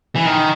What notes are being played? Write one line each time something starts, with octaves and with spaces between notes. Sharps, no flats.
E3
D#3